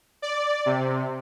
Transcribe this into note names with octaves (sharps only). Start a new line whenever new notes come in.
D5
C3